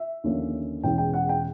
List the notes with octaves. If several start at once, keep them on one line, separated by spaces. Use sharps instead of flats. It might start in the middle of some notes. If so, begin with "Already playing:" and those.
Already playing: E5
D#2 D3 F3 A#3 C#4
E2 B2 G#3 C#4 E4 G5
G5
F#5
G5